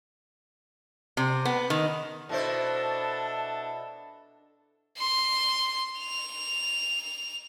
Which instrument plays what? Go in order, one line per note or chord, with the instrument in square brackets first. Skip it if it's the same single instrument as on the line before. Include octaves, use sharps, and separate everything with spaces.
[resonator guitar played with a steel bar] C3
B3
D#3
[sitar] B2 E4 C5 [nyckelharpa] D4 A4 [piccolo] A5
[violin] C6
F7